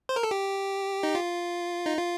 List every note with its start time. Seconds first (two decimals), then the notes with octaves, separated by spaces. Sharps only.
0.09 C5
0.16 A#4
0.23 A4
0.31 G4
1.03 D#4
1.15 F4
1.86 D#4
1.98 F4